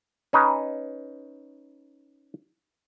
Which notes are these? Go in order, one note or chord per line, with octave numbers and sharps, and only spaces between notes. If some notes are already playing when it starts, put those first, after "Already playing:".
C#4 D#4 B4